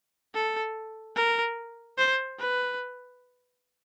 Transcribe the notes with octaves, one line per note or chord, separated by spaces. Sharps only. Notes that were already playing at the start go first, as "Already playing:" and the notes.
A4
A#4
C5
B4